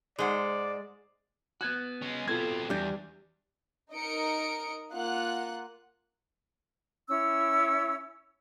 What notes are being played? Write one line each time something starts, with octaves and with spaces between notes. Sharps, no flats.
G#2 G#3 C5 D5 F#5
B3 F#4 F#6 G#6
G#3 C#4
B2 C4 F4 A4 G#6
E2 G3 D4 G6
D#4 A#4 D#5 C#7 D7
A#3 F4 F#5 F#6
C#4 E4 E6